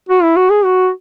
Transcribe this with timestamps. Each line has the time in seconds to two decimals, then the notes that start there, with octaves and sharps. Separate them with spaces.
0.09 F#4
0.23 E4
0.36 F#4
0.50 G#4
0.65 F#4